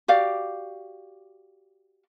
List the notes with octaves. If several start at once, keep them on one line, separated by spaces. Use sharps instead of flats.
F#4 G4 D5 F5